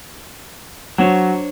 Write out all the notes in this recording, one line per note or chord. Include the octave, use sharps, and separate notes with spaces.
F#3 D4 C5 C#5